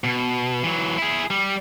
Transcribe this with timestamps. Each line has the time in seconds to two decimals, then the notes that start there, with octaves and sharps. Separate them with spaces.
0.04 B2
0.63 E3 F#3
0.98 E4 G#4
1.30 G3